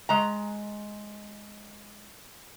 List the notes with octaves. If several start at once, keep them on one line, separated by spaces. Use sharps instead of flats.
G#3 A#5